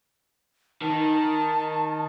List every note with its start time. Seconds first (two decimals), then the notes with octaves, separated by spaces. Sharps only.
0.82 D#3 A5